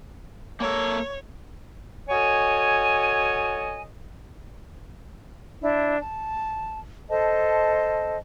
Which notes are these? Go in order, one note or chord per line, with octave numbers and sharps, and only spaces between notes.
A#3 A4 C#5
F#4 A4 C#5 D#5 G#5
D4 E4
A5
A4 C5 D#5 A5